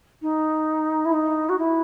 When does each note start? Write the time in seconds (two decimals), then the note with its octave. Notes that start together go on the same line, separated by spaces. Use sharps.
0.21 D#4
1.05 E4
1.12 D#4
1.49 F#4
1.58 E4